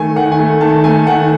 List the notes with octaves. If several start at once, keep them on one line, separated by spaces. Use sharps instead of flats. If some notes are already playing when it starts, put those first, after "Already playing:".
Already playing: D#3 A3 G#5
D#3 F#5
G#5
A3
D#3 A5
A3 G#5
D#3 F#5